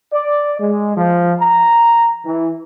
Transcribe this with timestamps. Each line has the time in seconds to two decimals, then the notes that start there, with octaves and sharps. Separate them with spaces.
0.12 D5
0.60 G#3
0.97 F3
1.40 A#5
2.26 E3